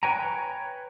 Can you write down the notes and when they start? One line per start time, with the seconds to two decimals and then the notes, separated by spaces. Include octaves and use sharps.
0.03 B4 C#5 G5 G#5 A#5